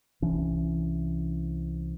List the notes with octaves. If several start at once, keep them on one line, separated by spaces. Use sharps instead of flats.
C2 E3 C#4 D4